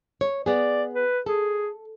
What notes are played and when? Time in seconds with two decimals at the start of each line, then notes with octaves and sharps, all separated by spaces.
0.21 C#5
0.46 B3 G#4 D5
0.95 B4
1.26 G#4 A4